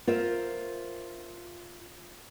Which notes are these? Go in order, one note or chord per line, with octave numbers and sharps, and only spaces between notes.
F4 A#4 C5 E5